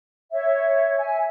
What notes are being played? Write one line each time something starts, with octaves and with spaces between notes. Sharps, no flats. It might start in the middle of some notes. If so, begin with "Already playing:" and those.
C#5 E5
E5 G#5